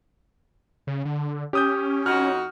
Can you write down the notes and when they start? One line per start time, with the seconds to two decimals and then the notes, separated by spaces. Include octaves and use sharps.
0.87 C#3
1.05 D3
1.53 C#4 G4 D#6 G6
2.06 F2 D#4 F#4 F6